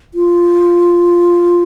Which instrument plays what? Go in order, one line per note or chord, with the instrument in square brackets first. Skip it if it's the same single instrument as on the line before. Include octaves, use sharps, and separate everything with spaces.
[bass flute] F4